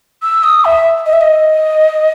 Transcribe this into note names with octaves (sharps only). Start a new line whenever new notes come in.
E6
D#6
E5
D#5
E5
D#5